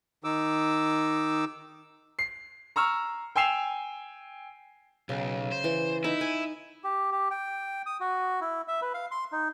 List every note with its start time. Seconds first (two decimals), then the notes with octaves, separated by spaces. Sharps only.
0.24 D#3 D#4 D6 E6
2.19 C7
2.76 A#5 C#6 E6 F6
3.36 G5 G#5 E6 C7 E7 F7
5.09 B1 C#3
5.52 C5
5.64 E3
6.04 D#4 E4
6.21 G#5
6.84 G4
7.12 G4
7.31 G5
7.86 D#6
8.00 F#4
8.41 E4
8.68 E5
8.82 B4
8.94 F5
9.11 C6
9.32 D#4